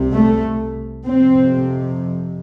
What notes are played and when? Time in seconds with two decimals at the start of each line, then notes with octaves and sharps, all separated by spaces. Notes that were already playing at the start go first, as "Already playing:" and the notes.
Already playing: C2 C3
0.13 A3
1.05 F2 C3 C4